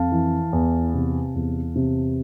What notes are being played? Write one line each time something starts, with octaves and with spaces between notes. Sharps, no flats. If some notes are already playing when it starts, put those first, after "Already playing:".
Already playing: F2 F5 A5
E3
E2
C3
E2
C3